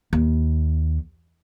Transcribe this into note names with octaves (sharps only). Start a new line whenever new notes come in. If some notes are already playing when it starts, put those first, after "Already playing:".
D#2